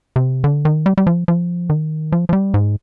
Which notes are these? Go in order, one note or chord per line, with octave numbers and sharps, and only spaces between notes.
C3
D3
D#3
G3
G3
F3
F3
D#3
F3
F3
G3
G#2